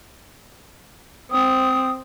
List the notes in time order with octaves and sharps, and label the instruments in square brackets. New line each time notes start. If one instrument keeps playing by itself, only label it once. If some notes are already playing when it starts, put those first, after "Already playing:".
[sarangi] C4 [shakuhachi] D#6